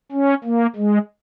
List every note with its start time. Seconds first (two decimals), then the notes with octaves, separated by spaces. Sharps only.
0.12 C#4
0.44 A#3
0.76 G#3